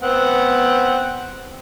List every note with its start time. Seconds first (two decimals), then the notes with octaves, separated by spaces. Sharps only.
0.02 B3 C4 F#5